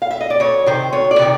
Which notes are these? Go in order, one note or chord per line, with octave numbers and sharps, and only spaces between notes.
F5
E5
D#5
D5
D2 C#5
C3 D#3 C5
D2 C#5
D5
C3 D#3